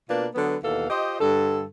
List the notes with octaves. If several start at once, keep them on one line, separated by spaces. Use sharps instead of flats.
B2 A#3 D4 F4 B4
D3 F#3 B3
D#2 B2 E3 A4 F5
F4 G4 C5 D#5
G2 D3 A4